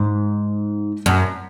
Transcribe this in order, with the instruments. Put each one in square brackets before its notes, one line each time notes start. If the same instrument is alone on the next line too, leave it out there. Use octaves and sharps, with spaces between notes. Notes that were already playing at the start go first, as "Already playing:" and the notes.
Already playing: [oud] G#2
F#2